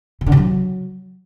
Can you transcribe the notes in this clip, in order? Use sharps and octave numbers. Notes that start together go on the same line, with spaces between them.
C#3
D3
C3
F#3